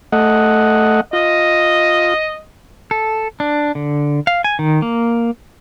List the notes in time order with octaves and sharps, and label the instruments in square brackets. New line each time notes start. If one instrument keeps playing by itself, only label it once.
[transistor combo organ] A3 D#5 F#5
[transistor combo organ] F4 [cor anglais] D#5
[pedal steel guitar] A4
D4
D3
F5
G#5
D#3
A#3